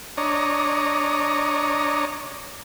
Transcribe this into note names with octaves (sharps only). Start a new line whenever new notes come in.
D4 C#5 D#5 A#5